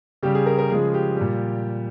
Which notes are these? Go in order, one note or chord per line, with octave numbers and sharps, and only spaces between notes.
C#3 G3 G4
G#4
A#4
A#4
C#3 F3 G#3 G#4
G4
A#2 G3